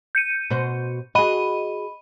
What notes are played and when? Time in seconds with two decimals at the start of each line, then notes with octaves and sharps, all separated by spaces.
0.15 G6 C#7 D#7
0.50 B2 F#4 C5
1.15 F#4 G#4 D#5 B5 D#7